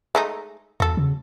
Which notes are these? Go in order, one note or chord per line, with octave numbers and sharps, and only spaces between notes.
G#3 A3 D#4
E2 F#4 A4
C#3